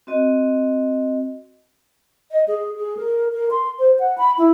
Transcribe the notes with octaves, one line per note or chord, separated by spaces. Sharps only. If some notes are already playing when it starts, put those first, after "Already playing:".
C4 F#4 D#5
D#5
G#4
G#4
A#4
A#4
C6
C5
F#5
B5
E4